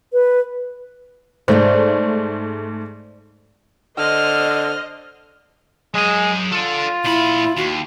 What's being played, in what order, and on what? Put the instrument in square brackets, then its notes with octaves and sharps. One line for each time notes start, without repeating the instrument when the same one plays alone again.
[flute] B4
[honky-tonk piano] G#2 A3 [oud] C5 D5
[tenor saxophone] D3 [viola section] C5 D#5 [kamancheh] F6
[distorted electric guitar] F#3 G#5 [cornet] G#3
[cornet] F4 [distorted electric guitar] A4 D5
[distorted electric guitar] A#2 B5 [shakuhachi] E4
[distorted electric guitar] D#2 [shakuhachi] F#4